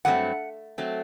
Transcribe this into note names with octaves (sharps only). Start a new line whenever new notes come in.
G2 F#3 A3 C4 F#5
F#3 A3 C4